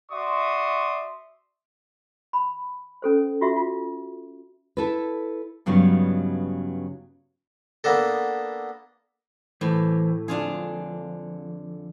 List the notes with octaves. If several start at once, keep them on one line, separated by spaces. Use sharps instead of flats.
F#4 D5 E5 C6 C#6 D#6
B5
C#4 A4 C5
F4 F#4 E5 C#6
F4
E4 A4 B4
G2 C#3 F#3 G3 B3 D#4
A#3 B3 D4 A4
A2 E3 C5
F2 D3 D4 F4 G#4